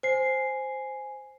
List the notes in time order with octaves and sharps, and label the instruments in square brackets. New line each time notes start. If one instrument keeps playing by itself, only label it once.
[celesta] C5 C7 [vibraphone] G#5